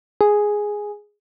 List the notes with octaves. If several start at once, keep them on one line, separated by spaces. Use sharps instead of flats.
G#4